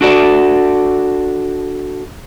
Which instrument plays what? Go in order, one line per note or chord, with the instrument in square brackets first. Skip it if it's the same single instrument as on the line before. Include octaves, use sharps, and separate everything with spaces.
[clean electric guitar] D4 F#4 A4 D5